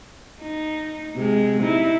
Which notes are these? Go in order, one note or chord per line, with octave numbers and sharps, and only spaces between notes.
D#4
C3 G#3
D#4 E4